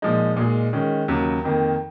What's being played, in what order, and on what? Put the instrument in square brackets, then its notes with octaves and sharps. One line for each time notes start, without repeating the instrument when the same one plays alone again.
[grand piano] A#2 F3 G#3 D#4
A#2 G#3 D#4 G#4
D#3 G#3 C#4
D#2 C#3 F#3
F2 D#3 A#3